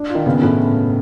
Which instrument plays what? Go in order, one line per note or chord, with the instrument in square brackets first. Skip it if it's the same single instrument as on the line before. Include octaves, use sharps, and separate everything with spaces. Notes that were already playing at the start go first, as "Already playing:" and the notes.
Already playing: [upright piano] D4
F4
[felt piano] D#3
[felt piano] C#3 [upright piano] B3
[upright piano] A2